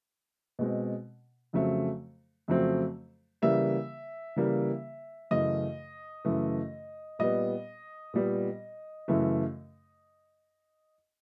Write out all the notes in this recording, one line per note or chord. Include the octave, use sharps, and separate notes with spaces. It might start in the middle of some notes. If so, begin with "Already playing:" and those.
B2 G#3 C4
F2 C#3 F#3 A3 C4
F2 C#3 F#3 A3 C4
C#3 E3 G3 A#3 E5
C#3 E3 G3 A#3
F#2 C#3 E3 A3 D#5
F#2 C#3 E3 A3
A#2 G3 B3 D#5
A#2 G3 B3
F#2 C#3 E3 A3